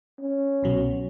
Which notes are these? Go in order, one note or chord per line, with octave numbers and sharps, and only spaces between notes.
C#4
C2 B2 F#3